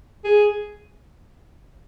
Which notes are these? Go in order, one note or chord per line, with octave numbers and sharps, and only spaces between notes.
G#4